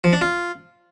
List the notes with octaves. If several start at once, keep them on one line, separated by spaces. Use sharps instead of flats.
F3
D4
F4